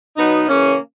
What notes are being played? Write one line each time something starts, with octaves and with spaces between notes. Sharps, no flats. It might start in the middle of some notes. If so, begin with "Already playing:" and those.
B2 F#3 B3 D#4
C#3 E3 A#3 C#4